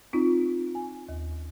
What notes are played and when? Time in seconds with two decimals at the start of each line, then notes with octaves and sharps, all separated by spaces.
0.13 C4 D#4 F4
0.75 G#5
1.09 D#2